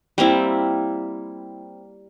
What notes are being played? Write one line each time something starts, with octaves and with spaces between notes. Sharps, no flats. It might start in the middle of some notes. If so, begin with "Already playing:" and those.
G3 A#3 C4 E4